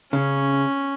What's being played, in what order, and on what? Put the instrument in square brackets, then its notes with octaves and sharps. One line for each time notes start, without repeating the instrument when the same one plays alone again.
[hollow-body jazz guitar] C#3 [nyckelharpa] C#4